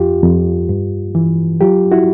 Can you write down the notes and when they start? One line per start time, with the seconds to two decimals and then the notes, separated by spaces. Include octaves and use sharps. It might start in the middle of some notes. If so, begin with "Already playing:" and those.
Already playing: F2 F4 G4
0.23 F2
0.69 G2
1.15 E3
1.61 F#3 F4 G4
1.92 E4 F#4